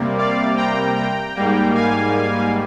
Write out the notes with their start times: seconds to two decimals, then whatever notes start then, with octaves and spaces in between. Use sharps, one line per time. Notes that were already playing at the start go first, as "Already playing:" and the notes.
Already playing: C3 G3 A#3
0.18 D5 F5
0.57 G5 A#5
0.96 G5 A#5
1.36 G#2 G3 A#3
1.75 F5 G#5